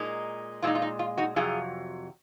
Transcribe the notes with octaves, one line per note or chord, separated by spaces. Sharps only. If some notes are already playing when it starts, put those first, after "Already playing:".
Already playing: A#2 G#3 D#4
A#2 G#3 D#4 F4
F4
D#4
F4
D#4 F#4
F2 C3 F#3 F4 G#4